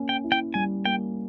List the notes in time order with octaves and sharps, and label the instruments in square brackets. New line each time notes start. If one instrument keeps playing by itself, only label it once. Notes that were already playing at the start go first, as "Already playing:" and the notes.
Already playing: [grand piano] A#3 C#4
[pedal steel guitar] G5
[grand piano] E4
[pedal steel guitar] G5
[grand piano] G3 [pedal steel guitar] G#5
[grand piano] A#3 [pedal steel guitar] G5